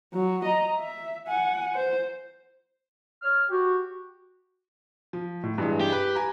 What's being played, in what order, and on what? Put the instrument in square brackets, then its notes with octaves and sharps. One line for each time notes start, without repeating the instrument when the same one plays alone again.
[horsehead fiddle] F#3
D#5 A#5
E5
F#5 G#5
C5
[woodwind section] C#5 F6
F#4 G4
[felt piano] F3
A2
G2 E3 G#3
[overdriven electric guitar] G4
[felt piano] B4
G#5 A#5